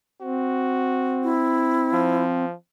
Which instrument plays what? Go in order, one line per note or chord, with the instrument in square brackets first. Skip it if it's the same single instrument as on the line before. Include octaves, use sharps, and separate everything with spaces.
[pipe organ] C4 [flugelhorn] F#4
[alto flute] E4
[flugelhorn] F3